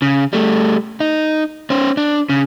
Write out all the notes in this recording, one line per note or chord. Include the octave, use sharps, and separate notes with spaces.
C#3
G3 A3
D#4
C#4 C5
D4
C#3